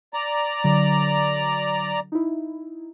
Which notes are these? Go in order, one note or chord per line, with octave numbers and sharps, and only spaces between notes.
D5 A#5
D3 F#3
D#4 E4